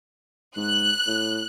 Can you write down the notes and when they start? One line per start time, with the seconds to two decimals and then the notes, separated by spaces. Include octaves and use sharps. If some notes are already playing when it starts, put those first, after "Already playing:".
0.57 G#2 F#6
1.07 A2